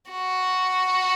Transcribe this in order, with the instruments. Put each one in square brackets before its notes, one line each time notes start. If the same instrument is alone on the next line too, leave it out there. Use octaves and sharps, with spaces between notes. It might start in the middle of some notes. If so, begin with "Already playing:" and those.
[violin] F#4